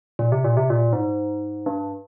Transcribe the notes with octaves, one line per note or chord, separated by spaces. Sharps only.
A#2
C3
A#2
C3
A#2
G#2
G2